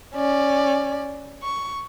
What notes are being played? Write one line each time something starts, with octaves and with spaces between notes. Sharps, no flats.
C#4 D5
C#6